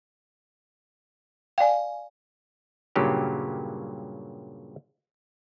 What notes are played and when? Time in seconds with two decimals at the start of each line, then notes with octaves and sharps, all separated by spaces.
1.58 D5 F5 G5 G#5
2.96 G2 A#2 C#3 F#3 G4